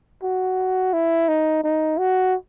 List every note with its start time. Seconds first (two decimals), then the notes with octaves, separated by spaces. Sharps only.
0.23 F#4
0.94 E4
1.28 D#4
1.64 D#4
1.99 F#4